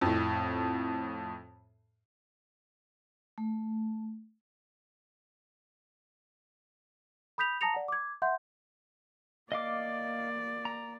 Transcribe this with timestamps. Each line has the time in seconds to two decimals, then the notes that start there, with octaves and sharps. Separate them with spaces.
0.01 F2 A2
3.38 A3
7.38 B5 D#6 G6 B6 F7
7.61 A5 A#5 D#6 A#6 C#7 F7
7.74 D5 F#5
7.88 D6 G#6
8.22 E5 F#5 C6 G6
9.52 A#3 D5 D#5 F5 D6
10.65 A#5